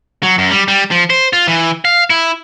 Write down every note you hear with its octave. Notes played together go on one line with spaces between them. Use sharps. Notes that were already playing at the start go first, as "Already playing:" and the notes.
F#3
F#2
G3
G3
F3
C5
F4
E3
F5
E4